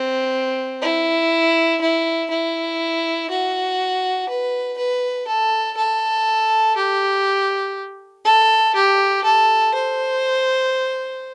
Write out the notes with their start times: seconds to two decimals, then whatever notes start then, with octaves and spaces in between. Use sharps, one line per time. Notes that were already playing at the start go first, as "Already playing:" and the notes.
Already playing: C4
0.82 E4
1.81 E4
2.30 E4
3.30 F#4
4.29 B4
4.78 B4
5.28 A4
5.77 A4
6.77 G4
8.25 A4
8.75 G4
9.24 A4
9.74 C5